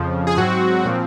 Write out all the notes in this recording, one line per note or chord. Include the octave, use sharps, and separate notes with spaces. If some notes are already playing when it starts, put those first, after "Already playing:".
Already playing: F2 C#3 F3
G#4
G#2 F#3 C4 F#4
A#2 F3 C4